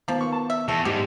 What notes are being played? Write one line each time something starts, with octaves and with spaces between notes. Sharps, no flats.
D#3 F3 A#3 B3
C#6
A5
E5
E2 A3
G#2 G3 G4